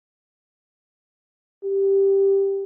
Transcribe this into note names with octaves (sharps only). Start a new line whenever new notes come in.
G4